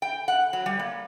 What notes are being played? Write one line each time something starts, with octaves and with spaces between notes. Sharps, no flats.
G5
F#5
F#3
G3
A#3